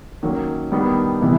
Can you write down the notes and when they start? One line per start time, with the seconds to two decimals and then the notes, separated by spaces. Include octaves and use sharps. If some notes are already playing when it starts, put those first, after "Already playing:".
0.23 D#3 F#3 A#3 C#4
0.72 D#3 G3 B3 D4
1.21 C3 E3 G3 B3 E4